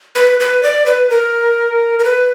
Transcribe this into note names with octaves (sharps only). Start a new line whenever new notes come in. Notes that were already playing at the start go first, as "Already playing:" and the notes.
B4
B4
D5
B4
A#4
A#4
B4